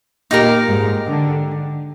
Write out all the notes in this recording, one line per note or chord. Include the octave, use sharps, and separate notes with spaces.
A#2 A#3 D#4 G4 A#4
G#2 G#3
D3